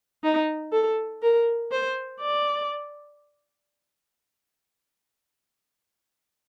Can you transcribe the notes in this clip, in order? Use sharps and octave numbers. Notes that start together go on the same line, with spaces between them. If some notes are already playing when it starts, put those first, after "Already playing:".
D#4
A4
A#4
C5
D5